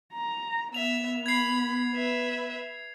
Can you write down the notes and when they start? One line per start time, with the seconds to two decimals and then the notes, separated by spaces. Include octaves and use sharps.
0.13 A#5
0.74 B3 E5 F7
1.26 B5 G#6 C7
1.93 B4 E5